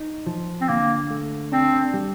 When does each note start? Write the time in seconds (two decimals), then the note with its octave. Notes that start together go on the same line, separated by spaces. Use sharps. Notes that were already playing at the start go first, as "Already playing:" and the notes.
Already playing: D#4
0.27 F3
0.61 C4
0.68 D3 A#3
1.11 A3
1.52 C4 D4
1.94 G3